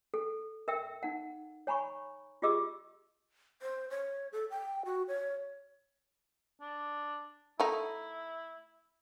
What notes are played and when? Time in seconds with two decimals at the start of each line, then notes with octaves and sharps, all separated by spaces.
0.14 A4
0.68 A#4 E5 G5 E6
1.03 D#4 F#5
1.67 C#5 G#5 A#5 B5 C#6
2.42 F4 G4 G#4 D#5 D6 E6
3.62 C5
3.90 C#5
4.32 A4
4.51 G5
4.85 F#4
5.08 C#5
6.60 D4
7.60 A3 D#4 E4